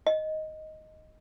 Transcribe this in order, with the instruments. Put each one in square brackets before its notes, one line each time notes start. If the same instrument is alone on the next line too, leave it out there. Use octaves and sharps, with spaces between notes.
[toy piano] D#5